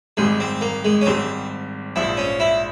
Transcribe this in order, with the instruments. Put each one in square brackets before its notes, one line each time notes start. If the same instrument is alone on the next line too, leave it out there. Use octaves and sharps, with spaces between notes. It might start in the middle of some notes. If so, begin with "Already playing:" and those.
[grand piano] G#1 G#2 G3 [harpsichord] G#3
[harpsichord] C4
A#3
G#3
C#4
[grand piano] G#1 G#2 G3 [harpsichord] C4
[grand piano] A#1 G#2 F3 [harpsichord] E4
[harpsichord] C#4
E4